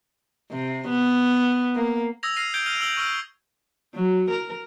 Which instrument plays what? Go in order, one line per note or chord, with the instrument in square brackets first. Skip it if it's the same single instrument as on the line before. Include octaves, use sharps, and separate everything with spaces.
[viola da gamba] C3
B3
A#3
[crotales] D#6 E6 G#6 A#6 F7
F6 A#6 C7 D#7 F7
G6 G#6 D7 G7
F6 D#7 F7 G7
E6 F#7 G7
C#6 E6 F6 D7
[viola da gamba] F#3
A#4